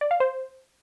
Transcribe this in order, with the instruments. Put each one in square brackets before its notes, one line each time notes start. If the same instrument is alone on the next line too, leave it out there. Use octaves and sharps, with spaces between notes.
[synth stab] D5
F5
C5